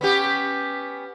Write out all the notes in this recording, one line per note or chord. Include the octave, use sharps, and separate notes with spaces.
B3 C#4 G4